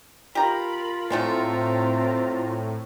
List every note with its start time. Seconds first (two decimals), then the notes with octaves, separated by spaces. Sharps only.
0.35 F4 G4 A#4 A#5 B5
1.10 A2 F3 G#3 A3 C4 A#5